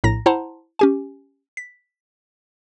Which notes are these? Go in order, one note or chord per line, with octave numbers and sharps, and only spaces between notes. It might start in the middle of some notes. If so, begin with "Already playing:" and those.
A#1 A2 A#5 A#6
E4 C5 F#5 A5 A#5 C6
C#4 G4 G#5
B6